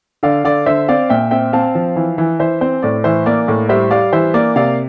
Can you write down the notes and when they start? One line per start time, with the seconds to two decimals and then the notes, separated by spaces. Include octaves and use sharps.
0.23 D3 D5 F5
0.44 D3 D5 F5
0.66 D3 C5 E5
0.88 C4 D5 F5
1.10 A#2 E5 G5
1.31 C4 E5 G5
1.53 C4 F5 A5
1.75 F3
1.96 E3
2.18 E3
2.40 E3 C5 E5
2.61 C4 C5
2.83 A2 D5
3.04 E3 C5 E5
3.26 A#3 D5
3.48 A2
3.69 G3 C5 E5
3.91 G3 D5 F5
4.12 E3 C5 E5
4.34 A#3 D5
4.56 C3 D5 F5